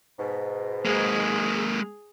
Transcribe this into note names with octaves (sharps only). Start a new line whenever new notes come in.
G#2 B2
G#3 A#3 G#4